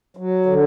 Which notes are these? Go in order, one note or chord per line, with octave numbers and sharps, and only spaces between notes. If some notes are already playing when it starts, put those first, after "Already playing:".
F#3
D3